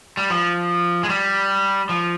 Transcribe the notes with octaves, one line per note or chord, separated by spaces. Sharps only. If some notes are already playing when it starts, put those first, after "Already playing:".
G3
F3
G#3
G3
F3